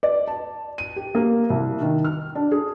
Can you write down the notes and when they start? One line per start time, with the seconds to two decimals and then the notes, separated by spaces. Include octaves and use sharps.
0.03 D5
0.28 A5
0.78 D#7
0.96 G4
1.15 A#3
1.50 C2
1.81 D#3
2.04 F6
2.35 D4
2.51 G#4